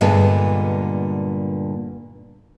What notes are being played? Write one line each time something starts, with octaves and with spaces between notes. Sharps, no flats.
G2 A#2 D3 G#3 B3 A5